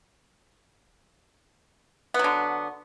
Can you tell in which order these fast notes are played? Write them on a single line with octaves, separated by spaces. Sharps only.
B3 F#3 D3